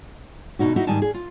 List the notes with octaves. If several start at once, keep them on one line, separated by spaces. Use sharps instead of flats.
D2 B2 D#4 F#4
D#4 E4 F#4
G#2 D#3 G3 G#3 G#5 A5
G#4
F4